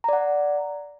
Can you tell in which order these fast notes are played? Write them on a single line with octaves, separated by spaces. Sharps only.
A#5 D5 F#5